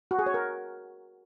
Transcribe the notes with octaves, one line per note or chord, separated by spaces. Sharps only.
F#4
G#4
C#5
A#4